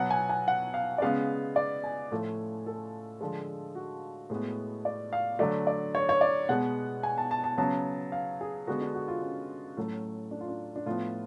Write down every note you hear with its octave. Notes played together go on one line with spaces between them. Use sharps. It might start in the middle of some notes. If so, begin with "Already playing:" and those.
Already playing: B2 F#3 B3 F#5
G#5
G#5
F#5
F5
D5
C#3 G#3 B3 F5
D5
G#5
A2 F3 A3
A4
D3 F3 G#3
F#4
A2 G#3 B3
D5
F5
D3 F#3 A3 D5
D5
C#5
C#5
D5
B2 G#3 B3 F#5
G#5
A5
A5
A5
C#3 F#3 B3 A5
F5
G#4
D3 G#3 B3 F#4
D4
F#4
F4
C#4
A2 F#3 A3
D4
F4
D4
D4
A2 F3 B3 F4